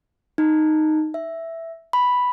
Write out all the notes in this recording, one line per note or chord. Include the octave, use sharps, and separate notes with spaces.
D#4
E5
B5